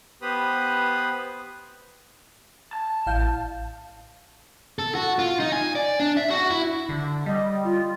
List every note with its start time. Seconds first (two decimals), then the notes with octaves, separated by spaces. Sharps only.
0.22 B3 G4 B4 C5 B5 D#6
2.73 A5
3.07 A1 F5 G6
4.79 A4
4.95 F#4
5.19 F4
5.40 D#4
5.52 G#5
5.75 D5
6.00 D4
6.17 E5
6.30 F#4
6.50 E4
6.89 D3
7.26 G3 D#5
7.64 F4